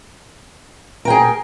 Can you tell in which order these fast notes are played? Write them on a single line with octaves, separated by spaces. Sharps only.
A#4 G5 G#4